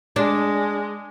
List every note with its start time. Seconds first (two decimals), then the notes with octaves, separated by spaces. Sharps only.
0.16 G#3 D4